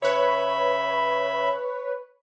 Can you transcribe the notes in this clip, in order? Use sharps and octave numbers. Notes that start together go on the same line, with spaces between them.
C#3 B4 C#5 E5 B5